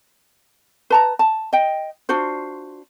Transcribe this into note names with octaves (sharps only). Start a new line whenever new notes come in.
B4 A5 A#5
A5
D#5 G5
D4 F4 F#4 C5